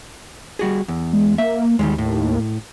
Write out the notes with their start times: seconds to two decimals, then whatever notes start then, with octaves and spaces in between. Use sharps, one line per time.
0.59 G3 F#4 G#4
0.88 E2
1.13 G#3
1.38 A#3 E5
1.79 D#2 D#3 G3 G#3
1.98 A2